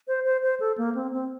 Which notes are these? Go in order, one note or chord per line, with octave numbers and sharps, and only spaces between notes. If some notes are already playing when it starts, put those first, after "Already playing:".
C5
C5
C5
A4
A#3
C4
C4